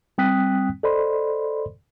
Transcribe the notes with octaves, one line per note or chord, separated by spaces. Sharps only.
G3 C4 G5 D#6 F#6 B6
A4 C5 D5 D#5 B5 C6